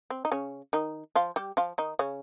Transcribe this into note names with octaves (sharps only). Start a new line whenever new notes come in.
C4
D#4
C#3 C#4
D#3 D#4
F3 F4
G3 G4
F3 F4
D#3 D#4
C#3 C#4